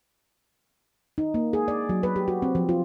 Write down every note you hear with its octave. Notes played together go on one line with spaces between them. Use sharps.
D#4
A#3
G#4
D5
F#3
B4
G4
F#4
C4
F3
F4